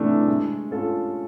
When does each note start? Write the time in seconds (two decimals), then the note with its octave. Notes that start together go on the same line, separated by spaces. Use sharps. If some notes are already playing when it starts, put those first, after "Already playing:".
Already playing: C3 E3 A3 D4
0.28 G#3
0.71 C#4 F4 A4